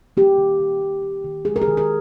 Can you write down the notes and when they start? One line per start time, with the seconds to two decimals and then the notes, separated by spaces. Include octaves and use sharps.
0.17 A#3 G4
0.38 D#3
0.60 D#3
0.81 A#3
1.03 A#3
1.24 D#3
1.45 G#3 G#4
1.56 A#4
1.62 G#4
1.68 D#3
1.77 A#4